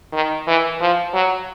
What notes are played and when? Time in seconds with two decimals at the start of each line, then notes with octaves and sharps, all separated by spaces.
0.13 D#3
0.47 E3
0.80 F3
1.14 F#3